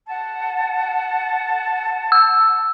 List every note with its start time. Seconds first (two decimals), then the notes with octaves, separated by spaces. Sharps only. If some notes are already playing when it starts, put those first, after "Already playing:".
0.08 F#5 A5
2.12 E6